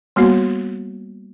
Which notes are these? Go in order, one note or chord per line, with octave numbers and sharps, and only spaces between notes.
G3 A#3 B3 F#4